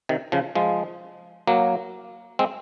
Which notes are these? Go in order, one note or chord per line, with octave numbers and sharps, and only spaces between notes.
C3 D#3
C#3 F3
F3 G#3
F#3 A#3
G#3 C4